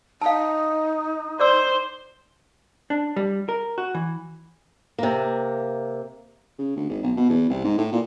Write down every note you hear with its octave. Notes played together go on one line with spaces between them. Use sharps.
D#4 F5 A5
C5 D5 D6 E6
D4
G3
A#4
F#4
E3
C3 A#3
C#3
D2
G#1
B1
B2
E2
C2
G#2
A2
A#2